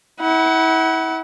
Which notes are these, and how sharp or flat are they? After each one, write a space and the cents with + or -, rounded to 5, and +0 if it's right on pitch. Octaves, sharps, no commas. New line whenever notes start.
E4 -30 F#5 +20